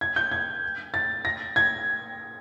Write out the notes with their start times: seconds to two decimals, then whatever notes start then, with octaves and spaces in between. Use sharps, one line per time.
0.01 G#6
0.16 G6
0.32 G#6
0.94 A6
1.25 A#6
1.56 G#6